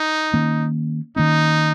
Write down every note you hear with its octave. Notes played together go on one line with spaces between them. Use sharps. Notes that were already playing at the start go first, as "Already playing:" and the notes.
Already playing: D#4
D#3 A#3 C#4
D#3 A#3 C#4 D#4